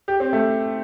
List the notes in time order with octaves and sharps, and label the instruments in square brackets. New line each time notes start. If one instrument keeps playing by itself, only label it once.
[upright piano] G4
C4
A3